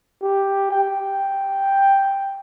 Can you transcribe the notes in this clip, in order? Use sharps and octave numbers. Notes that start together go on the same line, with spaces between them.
G4
G5